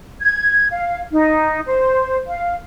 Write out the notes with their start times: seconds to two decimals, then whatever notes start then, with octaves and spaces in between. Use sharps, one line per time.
0.21 G#6
0.71 F5
1.11 D#4
1.66 C5
2.27 F5